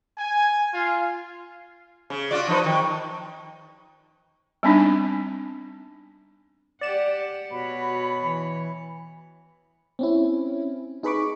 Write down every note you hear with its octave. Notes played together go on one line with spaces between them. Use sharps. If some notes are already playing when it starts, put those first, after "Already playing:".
G#5
F4
C#3
F4 F#4 D5
F3 D#4 B4
D#3
G3 B3 C4 D4 D#4
G4 D5 F#5 E7
B2 F#4 C#5 B5
E3
C4 C#4 E4
D#4 G#4 B4 B5 C#6 D6